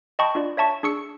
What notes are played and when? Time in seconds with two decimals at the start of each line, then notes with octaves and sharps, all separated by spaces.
0.19 D#5 G5 A5 B5 C#6
0.35 D4 F4 D5
0.57 C#5 E5 A5 C#6
0.83 D4 G#4 C#6 E6 C#7